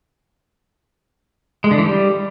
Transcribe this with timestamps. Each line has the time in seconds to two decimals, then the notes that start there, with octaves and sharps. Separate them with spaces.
1.64 G#3
1.71 D3
1.78 E3
1.85 G3